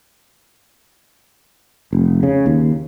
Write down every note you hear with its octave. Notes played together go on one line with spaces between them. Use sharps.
F1
C#3
D#2